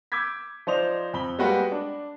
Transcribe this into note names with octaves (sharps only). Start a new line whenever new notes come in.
D6 E6 G6 G#6 B6
F3 D#4 C5 D5 F7
F2 B5 G7
G3 G#3 A#3 F#4 B4 G5
D4